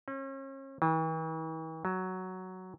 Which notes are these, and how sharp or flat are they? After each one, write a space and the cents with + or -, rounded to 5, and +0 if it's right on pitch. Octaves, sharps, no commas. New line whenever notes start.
C#4 -40
E3 -45
F#3 +5